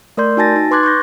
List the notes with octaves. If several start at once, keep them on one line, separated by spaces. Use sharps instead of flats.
A3 A#4 D5 C6 G6
D#4 F#4 G#5 A5 A6 A#6
D#4
B4 C6 D6 F#6 G#6 A6
C#6 F#6 G6 A#6